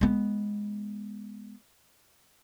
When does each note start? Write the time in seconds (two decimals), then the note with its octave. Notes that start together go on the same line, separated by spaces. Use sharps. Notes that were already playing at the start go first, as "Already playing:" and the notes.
0.01 G#3 B3